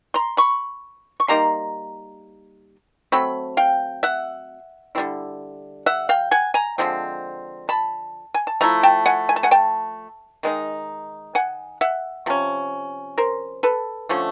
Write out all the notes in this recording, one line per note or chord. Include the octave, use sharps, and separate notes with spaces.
A#5 C6
B5 C#6
C#6
G3 A#3 D#4 A#5 C6
F#3 A3 C4 B5
F5 G5
E5 F#5
D3 G3 C4 E4
E5 F#5
F5 G5
F#5 G#5
G#5 A#5
D3 F3 G#3 C4
A5 B5
G#5
A5
F3 A3 E4 A#5
G5 A5
F#5 G#5
G#5
A5
F#5 G#5
G5 A5
D#3 G#3 B3 D#4
F#5 G#5
E5 F#5
C3 F3 C#4
A#4 C5
A4 B4
D3 F3 A3 C#4